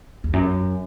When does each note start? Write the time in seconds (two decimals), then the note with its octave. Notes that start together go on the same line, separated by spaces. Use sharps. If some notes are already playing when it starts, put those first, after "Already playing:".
0.24 E2
0.33 F#2